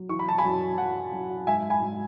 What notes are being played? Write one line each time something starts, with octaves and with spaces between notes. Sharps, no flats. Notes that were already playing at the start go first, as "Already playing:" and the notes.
Already playing: F#3
E3 C#6
B5
A5
G#5 B5
F#2
F#2 F#5
F#2
G#2 E5 G#5
G#5 B5
G#2